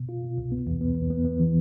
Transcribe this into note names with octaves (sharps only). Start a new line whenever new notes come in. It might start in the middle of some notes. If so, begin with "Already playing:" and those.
Already playing: B2
F4
B2
C2
B3
E2
B3
E2
B3
B3
E3